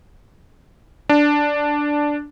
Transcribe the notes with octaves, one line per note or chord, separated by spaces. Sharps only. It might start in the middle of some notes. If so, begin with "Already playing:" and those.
D4